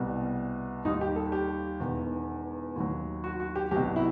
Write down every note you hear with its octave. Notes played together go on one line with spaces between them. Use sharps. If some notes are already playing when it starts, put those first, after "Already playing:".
Already playing: C2 B2 G3
D#2 D#3 G3 D#4
G4
A4
G4
E1 E2 D#3
D#2 D#3 F#3
F#4
F#4
G4
C2 B2 F#3 G4
E4